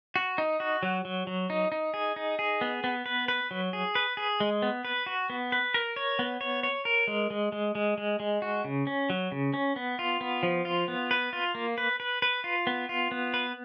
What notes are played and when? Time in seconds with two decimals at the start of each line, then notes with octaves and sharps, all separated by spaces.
0.16 F#4
0.38 D#4
0.60 F#4
0.83 F#3
1.05 F#3
1.27 F#3
1.50 D#4
1.72 D#4
1.94 G#4
2.16 D#4
2.39 G#4
2.61 B3
2.84 B3
3.06 B4
3.28 B4
3.51 F#3
3.73 G#4
3.95 B4
4.17 G#4
4.40 G#3
4.62 B3
4.85 B4
5.06 F#4
5.30 B3
5.52 B4
5.74 A#4
5.96 C#5
6.19 B3
6.41 C#5
6.63 C#5
6.85 A#4
7.08 G#3
7.30 G#3
7.52 G#3
7.75 G#3
7.98 G#3
8.20 G#3
8.42 F#4
8.64 C#3
8.87 C#4
9.10 F#3
9.32 C#3
9.54 C#4
9.76 B3
9.99 F4
10.21 B3
10.43 F3
10.65 F4
10.88 B3
11.11 B4
11.33 F4
11.55 A#3
11.78 B4
12.00 B4
12.22 B4
12.44 F4
12.67 B3
12.89 F4
13.11 B3
13.34 B4